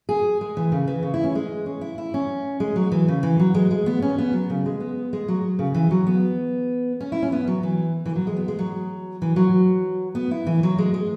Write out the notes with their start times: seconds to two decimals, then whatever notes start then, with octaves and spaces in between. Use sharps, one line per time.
0.09 G#4
0.41 G#3
0.57 E3
0.72 C#3
0.87 E3
1.03 C#3
1.14 E4
1.24 C#4
1.35 G#3
1.66 C#4
1.81 E4
1.98 E4
2.14 C#4
2.60 G#3
2.76 F#3
2.92 E3
3.08 C#3
3.23 E3
3.39 F#3
3.54 G#3
3.71 G#3
3.86 B3
4.02 C#4
4.18 B3
4.33 F#3
4.50 C#3
4.66 G#3
4.80 B3
5.13 G#3
5.28 F#3
5.59 C#3
5.74 E3
5.91 F#3
6.07 B3
7.00 C#4
7.12 E4
7.22 C#4
7.32 B3
7.47 F#3
7.63 E3
8.05 E3
8.16 F#3
8.27 G#3
8.37 B3
8.48 G#3
8.59 F#3
9.22 E3
9.36 F#3
10.15 B3
10.31 E4
10.47 E3
10.63 F#3
10.78 G#3
10.94 G#3